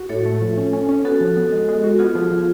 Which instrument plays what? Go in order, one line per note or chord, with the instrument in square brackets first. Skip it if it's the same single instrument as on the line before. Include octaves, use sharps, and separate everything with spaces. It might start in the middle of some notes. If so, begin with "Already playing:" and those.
Already playing: [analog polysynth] F#4
[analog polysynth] A2 [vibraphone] A4 C#5
[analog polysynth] A3
F3
C#4
C#4
C#4
[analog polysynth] B3 [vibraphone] F#4 A4
[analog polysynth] F3
B3
G#3
G#3
F#4
[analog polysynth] B3 [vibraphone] F4 G#4
[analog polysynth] F3
F3